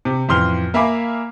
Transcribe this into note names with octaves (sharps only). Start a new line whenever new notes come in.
C3
A1 F2 E3 C6 F6 G7
A#3 E5 F5 G#5 B5 D6